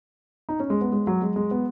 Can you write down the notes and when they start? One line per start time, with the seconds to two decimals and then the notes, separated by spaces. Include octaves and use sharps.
0.49 D#4
0.60 C#4
0.70 G#3
0.81 B3
0.92 G#3
1.07 F#3
1.22 G#3
1.36 G#3
1.51 B3